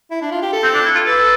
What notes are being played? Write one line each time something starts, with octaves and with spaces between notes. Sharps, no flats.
E4
D4
F4
G4
A4
C4
D4
E4
F4
A4 B4